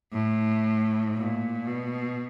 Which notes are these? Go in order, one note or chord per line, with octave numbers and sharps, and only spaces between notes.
A2
A#2
B2